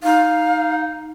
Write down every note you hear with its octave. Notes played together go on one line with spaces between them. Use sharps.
D#4 F5